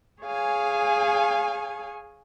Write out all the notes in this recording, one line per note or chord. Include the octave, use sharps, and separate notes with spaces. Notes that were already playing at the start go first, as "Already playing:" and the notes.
G#4 C#5 F5 G#5